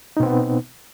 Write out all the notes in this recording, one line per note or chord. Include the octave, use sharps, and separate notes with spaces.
B2 B3 C4 D#4